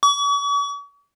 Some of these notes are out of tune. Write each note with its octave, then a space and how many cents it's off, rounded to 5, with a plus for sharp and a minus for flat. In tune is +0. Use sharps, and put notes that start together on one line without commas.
C#6 +45